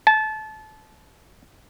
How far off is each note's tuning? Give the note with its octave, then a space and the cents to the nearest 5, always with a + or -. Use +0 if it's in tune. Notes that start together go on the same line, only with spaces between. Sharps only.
A5 -25